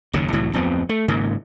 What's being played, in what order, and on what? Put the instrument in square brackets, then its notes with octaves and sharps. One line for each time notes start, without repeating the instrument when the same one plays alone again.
[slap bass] F#1 D#2 C#3
C2 A2 E3 F#3
D1 F2 B3 C4
A3
G#1 G#2 C#3 A#3